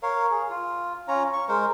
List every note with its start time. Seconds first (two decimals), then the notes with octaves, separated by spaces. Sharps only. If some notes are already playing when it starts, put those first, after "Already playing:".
0.03 A#4 C#5 F5
0.31 G#4
0.50 F4
1.08 C#4 F4 C#5 A#5
1.33 C#6
1.49 G#3 A#4 C5